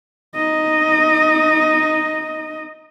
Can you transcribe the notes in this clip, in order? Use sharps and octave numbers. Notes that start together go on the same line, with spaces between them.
D#4 D#5